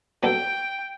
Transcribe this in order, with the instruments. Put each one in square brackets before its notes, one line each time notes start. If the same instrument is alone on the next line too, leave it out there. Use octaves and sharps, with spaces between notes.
[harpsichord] F#3 B3 D4 A4 [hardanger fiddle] G5